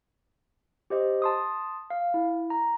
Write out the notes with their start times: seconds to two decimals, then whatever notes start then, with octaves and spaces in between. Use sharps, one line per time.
0.90 G4 C5 D#5
1.22 A5 C6 D#6
1.90 F5
2.14 E4
2.50 A#5